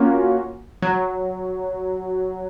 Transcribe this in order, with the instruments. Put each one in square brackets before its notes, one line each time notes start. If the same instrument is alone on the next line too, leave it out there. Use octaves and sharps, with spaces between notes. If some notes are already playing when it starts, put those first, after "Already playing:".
Already playing: [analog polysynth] A#3 C#4 F4 F#4
F#3